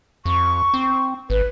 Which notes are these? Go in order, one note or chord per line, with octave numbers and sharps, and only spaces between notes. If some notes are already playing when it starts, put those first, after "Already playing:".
F2 C#6
C4
G#1 B4